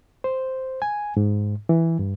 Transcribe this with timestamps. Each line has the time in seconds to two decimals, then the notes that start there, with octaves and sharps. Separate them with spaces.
0.24 C5
0.82 G#5
1.17 G#2
1.69 E3
1.99 G2